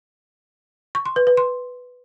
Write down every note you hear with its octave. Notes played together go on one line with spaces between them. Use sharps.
C#6
C6
B4
B4
C6